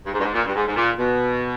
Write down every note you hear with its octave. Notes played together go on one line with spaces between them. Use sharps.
G2
G#2
G2
G#2
A#2
G2
G#2
G#2
A#2
B2